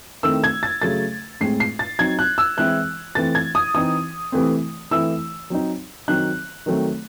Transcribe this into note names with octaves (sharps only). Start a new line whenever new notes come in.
D#3 A3 C4 E4 E6
G#6
A6
C#3 F#3 A3 A6
A2 G#3 C4 C7
C7
A6
F#3 C4 D#4 G#6
F#6
E6
E3 G#3 C4 E4 F#6
E3 A3 C4 A6
G#6
D#6
E3 C4 D#4 D#6
C3 E3 A3 C4
E3 A3 C4 E4 E6
F#3 C4 D#4
D#3 F#3 C4 D#4 F#6
D#3 F#3 A3 C4